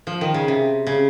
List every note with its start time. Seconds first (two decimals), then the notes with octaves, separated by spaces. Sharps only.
0.07 F3
0.21 D#3
0.34 C#3
0.48 C3
0.87 C#3